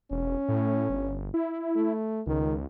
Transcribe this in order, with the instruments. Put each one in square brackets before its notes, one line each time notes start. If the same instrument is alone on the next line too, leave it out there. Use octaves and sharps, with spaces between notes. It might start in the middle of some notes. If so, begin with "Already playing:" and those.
[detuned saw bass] E1 [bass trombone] C#4
[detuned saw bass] A2
G1
E4
[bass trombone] A3
[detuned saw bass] C#2 [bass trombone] D#3